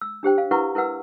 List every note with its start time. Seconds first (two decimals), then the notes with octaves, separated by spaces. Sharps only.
0.01 E6
0.23 D4 G4 C5 G5
0.38 F5
0.51 E4 A#4 B4 F#5 A#5 C#6
0.75 E4 A#4 B4 F#5 E6